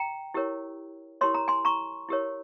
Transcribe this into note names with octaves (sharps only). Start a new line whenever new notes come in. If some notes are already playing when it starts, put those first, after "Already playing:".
Already playing: G5 A#5
E4 G4 A#4 C#5
E4 G4 A#4 C#5 C6
A#5
G#5 C6
A#5 C#6
E4 G4 A#4 C#5